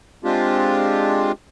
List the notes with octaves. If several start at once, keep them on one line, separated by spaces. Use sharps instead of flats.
G#3 C4 D4 F4 G4